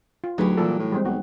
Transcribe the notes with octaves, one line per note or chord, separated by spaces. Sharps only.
F4
D2 F#3 D#4 G4 G#4 B4
A#2 E3 G3 A4
A2
G3 G#3 C4
B1 D#4 F#4